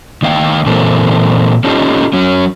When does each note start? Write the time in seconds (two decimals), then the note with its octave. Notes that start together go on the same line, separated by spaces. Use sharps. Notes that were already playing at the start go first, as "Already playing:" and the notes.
0.22 D#3 A3 F5 G5
0.66 A#2 E3 A#3 C4 A4
1.64 C#4 D#4 F4 G4 A4
2.13 F#3 C#4